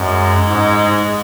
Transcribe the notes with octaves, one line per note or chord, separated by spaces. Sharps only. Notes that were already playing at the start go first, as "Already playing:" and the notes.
Already playing: F#2 G#3
G#2